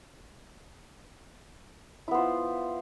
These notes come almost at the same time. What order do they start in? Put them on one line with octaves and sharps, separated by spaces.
E4 B3 C5 F4